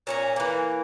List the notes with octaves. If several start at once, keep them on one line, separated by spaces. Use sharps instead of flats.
A#2 C#4 A#5
E3 A#3